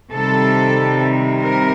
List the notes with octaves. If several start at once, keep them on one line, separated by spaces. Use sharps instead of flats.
C3 D#3 G3 A4
A#4